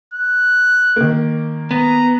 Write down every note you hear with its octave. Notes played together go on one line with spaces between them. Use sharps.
F#6
D#3 A#3
B3 A#5